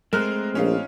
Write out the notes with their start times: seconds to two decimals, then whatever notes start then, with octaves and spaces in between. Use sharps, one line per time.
0.13 G#3 A3 C4 A#4 F6 F#6
0.55 A#1 C#4 D#4 F4